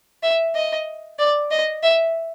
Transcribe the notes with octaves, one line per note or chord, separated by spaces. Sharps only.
E5
D#5
D5
D#5
E5